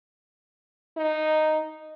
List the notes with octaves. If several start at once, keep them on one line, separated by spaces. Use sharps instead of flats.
D#4